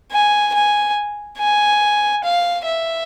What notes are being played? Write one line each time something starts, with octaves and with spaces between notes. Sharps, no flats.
G#5
G#5
G#5
F5
E5